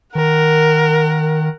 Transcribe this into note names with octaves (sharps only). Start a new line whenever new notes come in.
D#3 A#4 F#5